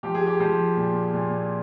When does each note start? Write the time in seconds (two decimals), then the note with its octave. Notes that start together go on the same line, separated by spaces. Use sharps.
0.03 F3 G4
0.15 G#4
0.26 G4
0.40 F3
0.77 A#2
1.13 A#2